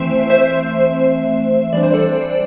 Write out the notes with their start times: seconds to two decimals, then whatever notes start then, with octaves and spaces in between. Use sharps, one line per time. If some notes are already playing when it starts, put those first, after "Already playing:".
Already playing: E3 A3 C4 C5 E5
0.30 C5 E5
1.73 E3 G3 D4 D5
1.83 C5
1.94 A4 D5